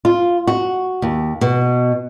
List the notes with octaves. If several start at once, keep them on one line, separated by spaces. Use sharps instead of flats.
F4
F#4
D#2
B2